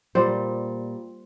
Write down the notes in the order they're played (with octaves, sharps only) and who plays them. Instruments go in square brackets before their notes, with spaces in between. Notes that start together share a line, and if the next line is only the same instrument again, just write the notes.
[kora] A#2 G3 C5